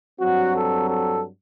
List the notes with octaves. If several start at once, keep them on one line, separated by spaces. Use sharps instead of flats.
G2 F#3 C4 F#4
A4
A4